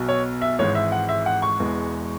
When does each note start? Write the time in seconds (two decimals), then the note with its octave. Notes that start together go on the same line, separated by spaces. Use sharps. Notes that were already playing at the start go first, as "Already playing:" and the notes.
Already playing: B1 B2 F#3
0.09 C#5
0.42 E5
0.59 G#1 G#2 E3 G#3 C#5
0.75 E5
0.92 F#5
1.09 E5
1.26 F#5
1.42 C#6
1.59 E1 E2 E3 G#3